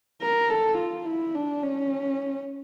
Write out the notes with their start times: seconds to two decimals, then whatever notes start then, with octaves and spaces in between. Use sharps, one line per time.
0.21 A#4
0.50 A4
0.78 F4
1.06 E4
1.34 D4
1.63 C#4